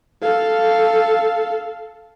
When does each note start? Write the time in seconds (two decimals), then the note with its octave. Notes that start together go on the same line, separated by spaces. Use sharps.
0.22 A4 F5